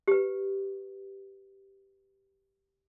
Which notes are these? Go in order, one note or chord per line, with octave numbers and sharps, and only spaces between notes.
G4 B4